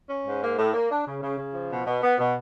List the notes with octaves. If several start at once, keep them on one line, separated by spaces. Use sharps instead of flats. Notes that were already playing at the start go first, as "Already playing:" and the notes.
C#4
G#2
A#3
A2
A#3
D4
C#3
C#3
C#3
F3
B2
B2
B3
B2